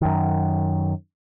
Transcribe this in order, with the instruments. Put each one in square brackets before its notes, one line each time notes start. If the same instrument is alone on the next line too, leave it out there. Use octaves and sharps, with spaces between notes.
[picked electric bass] F#2 D#3